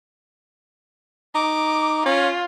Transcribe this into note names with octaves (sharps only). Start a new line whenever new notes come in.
D#4 D6
C#4 F4